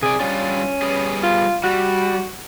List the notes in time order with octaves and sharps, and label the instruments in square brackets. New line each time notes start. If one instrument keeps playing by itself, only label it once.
[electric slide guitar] C3 D5 [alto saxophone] G#4
[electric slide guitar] G3 D4 F4 [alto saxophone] C#4
[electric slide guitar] G3 B3 G#4
[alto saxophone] F4
[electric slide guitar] G3 [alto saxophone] F#4